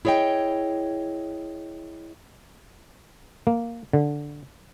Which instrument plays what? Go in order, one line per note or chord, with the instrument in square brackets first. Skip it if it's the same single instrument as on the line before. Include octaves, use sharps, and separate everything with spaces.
[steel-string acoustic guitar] E4 G#4 C#5 D#5 G5
[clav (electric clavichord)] A#3
D3